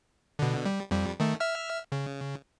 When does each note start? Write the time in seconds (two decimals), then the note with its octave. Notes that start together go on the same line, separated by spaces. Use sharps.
0.39 B2 D3
0.66 G3
0.91 F2 G3
1.20 D#3 A3
1.40 E5 F6
1.92 C#3